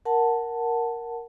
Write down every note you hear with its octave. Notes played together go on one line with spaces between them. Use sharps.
A#4 F#5 A5